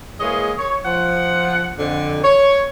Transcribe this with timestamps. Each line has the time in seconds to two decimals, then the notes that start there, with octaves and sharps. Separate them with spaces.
0.20 E3 G#3 A#3 G#4 C#5 D#5
0.59 C#5
0.85 F3 F#5
1.79 F2 D3
2.24 C#5